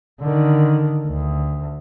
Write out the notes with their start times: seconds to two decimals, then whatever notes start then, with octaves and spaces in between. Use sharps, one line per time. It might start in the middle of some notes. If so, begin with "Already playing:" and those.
0.20 D3 D#3
1.07 D2